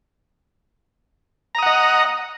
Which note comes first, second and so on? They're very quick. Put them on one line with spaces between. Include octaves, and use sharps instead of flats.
A#5 D#6 F#5 D#5